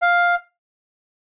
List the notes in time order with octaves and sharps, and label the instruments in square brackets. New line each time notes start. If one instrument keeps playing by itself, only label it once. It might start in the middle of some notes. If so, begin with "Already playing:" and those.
[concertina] F5